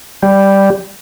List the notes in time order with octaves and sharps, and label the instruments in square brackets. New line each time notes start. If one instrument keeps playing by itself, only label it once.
[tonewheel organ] G3